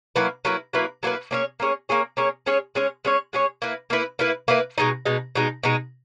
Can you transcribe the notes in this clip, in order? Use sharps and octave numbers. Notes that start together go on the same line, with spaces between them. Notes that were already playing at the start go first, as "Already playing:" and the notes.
F#3 A#3 E4 B4
F#3 A#3 E4 B4
F#3 A#3 E4 B4
F#3 A#3 E4 B4
A#3 C#4 G#4 C#5
A#3 C#4 G#4 C#5
A#3 C#4 G#4 C#5
A#3 C#4 G#4 C#5
G#3 C#4 G#4 C#5
G#3 C#4 G#4 C#5
G#3 C#4 G#4 C#5
G#3 C#4 G#4 C#5
A#3 E4 B4
A#3 E4 B4
A#3 E4 B4
A#3 E4 B4
B2 G#3 D#4
B2 G#3 D#4
B2 G#3 D#4
B2 G#3 D#4